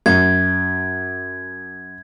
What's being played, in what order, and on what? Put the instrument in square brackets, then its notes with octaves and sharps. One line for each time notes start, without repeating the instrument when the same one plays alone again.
[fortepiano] F#2 [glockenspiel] G#6